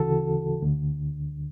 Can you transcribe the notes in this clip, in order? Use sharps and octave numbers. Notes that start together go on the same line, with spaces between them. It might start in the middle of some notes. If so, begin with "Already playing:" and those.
Already playing: D2 C#3 E3 F#4 A4
D2 D3